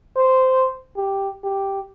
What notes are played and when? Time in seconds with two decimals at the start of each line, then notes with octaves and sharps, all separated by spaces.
0.17 C5
0.97 G4
1.44 G4